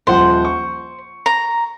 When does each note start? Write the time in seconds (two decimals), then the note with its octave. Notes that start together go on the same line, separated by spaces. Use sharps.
0.07 D#1 F3 C5 F#5
0.45 C#6
1.26 A#5